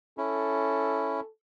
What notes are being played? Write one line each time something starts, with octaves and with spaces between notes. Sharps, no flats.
C#4 E4 A4